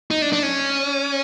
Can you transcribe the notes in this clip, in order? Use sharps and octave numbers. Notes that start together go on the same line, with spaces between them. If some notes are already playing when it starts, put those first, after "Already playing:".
D#4
D4
D4
C#4